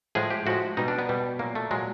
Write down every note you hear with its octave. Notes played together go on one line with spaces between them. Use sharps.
A2 F3 G#3 G#4
G4
A2 F3 G#3 F#4
B2 G3 D#4
D4
B3
B2 G3
A#2 F#3 A#3
A3
A#2 F#3 G#3